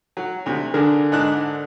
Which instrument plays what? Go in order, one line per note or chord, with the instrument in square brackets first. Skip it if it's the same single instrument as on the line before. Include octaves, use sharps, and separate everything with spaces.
[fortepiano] F#3
D2 C3
[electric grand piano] D3 A#4 [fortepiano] D4 G#4
[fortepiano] G#2 D4 F#6